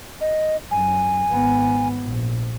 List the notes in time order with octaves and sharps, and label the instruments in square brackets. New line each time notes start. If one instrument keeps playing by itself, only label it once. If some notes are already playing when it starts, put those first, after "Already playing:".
[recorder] D#5
[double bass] F#2 [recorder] G#5
[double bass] G#1 B3
A#1